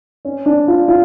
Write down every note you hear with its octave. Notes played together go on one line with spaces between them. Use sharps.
C#4
D4
F4
F4